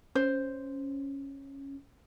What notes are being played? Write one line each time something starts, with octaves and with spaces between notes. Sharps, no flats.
C#4 C5